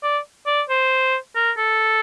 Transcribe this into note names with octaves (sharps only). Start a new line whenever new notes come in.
D5
D5
C5
A#4
A4